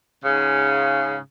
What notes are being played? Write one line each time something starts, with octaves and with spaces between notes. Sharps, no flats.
G#2 C#3